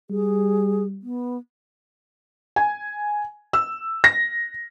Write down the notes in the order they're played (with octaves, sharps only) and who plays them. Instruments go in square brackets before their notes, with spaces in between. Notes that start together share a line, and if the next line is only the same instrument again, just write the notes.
[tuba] G3 [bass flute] G#4
[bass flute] B3
[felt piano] G#5
E6
A#6